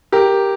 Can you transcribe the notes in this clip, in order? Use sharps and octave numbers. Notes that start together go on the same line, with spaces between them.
G4 A#4